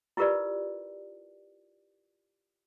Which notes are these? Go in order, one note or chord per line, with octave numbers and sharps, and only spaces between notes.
E4 F4 G4 A#4 B4 D5